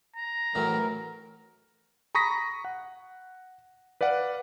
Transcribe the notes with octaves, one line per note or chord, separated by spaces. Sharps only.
A#5
A2 E3 F#3 A#4
A#5 B5 C#6 D#6 A#6 B6
F#5
B4 D5 F5 F#5